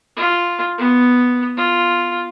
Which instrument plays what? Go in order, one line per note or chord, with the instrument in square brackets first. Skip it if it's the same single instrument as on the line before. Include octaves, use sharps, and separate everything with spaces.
[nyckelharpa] F4
B3
F4